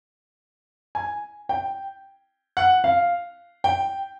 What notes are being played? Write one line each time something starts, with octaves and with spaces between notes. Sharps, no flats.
G#5
G5
F#5
F5
G5